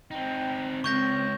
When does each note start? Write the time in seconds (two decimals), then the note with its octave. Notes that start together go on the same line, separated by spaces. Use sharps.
0.11 C4 D#4 G5
0.84 C#2 C4 C#6 G6 A#6